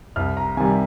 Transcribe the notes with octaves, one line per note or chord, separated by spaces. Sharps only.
C2 F6
A#5
C3 D#3 G3 G#5